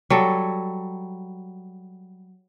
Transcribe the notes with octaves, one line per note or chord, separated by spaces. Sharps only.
F#3 G3 A4